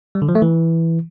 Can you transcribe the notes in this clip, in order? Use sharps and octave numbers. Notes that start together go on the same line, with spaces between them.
G3
D3
F3
A3
E3